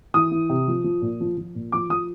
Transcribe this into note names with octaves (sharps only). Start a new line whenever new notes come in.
E3 D#6
E3
C3
F3
F3
A#2
F3
F3
A#2
F3 D6
F3 D#6